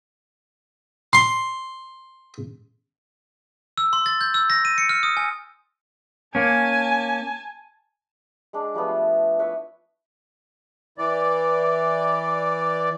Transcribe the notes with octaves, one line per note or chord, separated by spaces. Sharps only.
C6
E6
C6
A6
G6
E6
A#6
D#7
C#7
F6
D#6
G#5
A#3 C#4 G#5 A5
G#3 D4
F3 G3 A3 B3
F4
E4 B4 C#5 E5
E3 D5